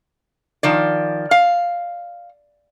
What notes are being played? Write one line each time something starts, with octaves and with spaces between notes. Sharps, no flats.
D#3 F3 D5
F5